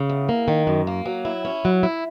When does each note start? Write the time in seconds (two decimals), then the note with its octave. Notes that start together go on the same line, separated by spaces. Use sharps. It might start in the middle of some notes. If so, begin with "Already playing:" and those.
Already playing: C#3
0.10 E2
0.29 A#3
0.48 D#3
0.67 F#2
0.87 A#3
1.06 F#3
1.25 E4
1.45 C#4
1.65 F#3
1.83 E4